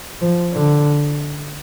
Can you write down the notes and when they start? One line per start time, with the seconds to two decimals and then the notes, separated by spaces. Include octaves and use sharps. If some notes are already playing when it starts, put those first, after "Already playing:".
0.22 F3
0.54 D3